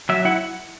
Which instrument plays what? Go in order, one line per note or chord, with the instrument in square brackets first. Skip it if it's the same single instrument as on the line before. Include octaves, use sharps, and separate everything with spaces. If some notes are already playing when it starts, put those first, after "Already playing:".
[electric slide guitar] F#3 E5
E4 F#5